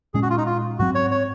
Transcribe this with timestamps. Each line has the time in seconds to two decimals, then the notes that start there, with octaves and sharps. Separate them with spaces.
0.14 A#2 G#3 C#4 G#4
0.23 F#4
0.30 F4
0.38 D#4
0.46 F4
0.79 G#2 F#3 C4 F#4
0.95 C#5
1.12 C#5